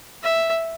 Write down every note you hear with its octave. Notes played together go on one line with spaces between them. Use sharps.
E5